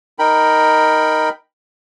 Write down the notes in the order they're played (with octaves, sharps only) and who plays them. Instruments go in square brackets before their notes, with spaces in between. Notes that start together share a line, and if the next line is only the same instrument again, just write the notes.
[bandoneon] D#4 A#4 G5 B5